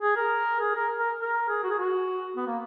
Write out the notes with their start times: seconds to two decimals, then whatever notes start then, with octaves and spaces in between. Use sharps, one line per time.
0.02 G#4
0.17 A#4
0.60 G#4
0.76 A#4
0.99 A#4
1.21 A#4
1.49 G#4
1.64 F#4
1.70 G#4
1.79 F#4
2.36 B3
2.47 A#3